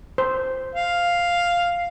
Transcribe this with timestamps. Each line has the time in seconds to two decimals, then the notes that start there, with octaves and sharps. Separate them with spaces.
0.18 C5
0.75 F5